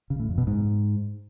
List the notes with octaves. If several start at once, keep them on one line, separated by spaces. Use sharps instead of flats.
C#3
A2
F2
B2
G#2